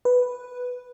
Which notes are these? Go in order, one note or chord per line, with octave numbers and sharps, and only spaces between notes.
B4